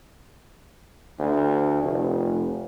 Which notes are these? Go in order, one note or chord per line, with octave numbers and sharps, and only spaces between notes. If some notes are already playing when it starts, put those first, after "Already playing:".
D2
F1